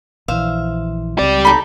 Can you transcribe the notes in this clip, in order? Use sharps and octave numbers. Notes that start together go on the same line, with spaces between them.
A#1 E3 C5 E5 F5
C#2 C4 G4 D5
D#4 A4 B5